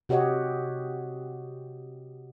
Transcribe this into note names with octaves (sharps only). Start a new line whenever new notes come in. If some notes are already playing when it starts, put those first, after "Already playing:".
C3 F#4 G4 C#5 D#5 F#5